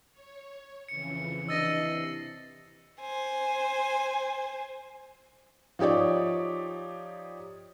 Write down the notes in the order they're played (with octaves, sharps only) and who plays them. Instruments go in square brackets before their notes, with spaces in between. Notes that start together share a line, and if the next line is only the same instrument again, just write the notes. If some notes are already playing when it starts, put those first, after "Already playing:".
[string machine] C#5
[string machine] F2 C#3 E3 [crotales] C#7
[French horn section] C3 E3 D4 [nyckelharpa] D#5 [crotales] E6 A6 A#6 [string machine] C7
[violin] C5 G#5
[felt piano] F3 D#4 G4 C#5 D5